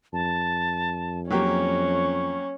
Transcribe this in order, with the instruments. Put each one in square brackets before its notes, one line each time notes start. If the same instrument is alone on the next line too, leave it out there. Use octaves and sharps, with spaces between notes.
[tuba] F2 [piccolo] A5
[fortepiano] F#3 A#3 G4 [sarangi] C#4 [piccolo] C#6